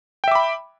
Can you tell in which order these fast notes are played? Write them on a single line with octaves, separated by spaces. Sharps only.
G5 E5 D6 B5